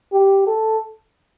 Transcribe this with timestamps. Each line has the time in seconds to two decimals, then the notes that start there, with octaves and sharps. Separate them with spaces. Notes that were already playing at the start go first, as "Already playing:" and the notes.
0.12 G4
0.47 A4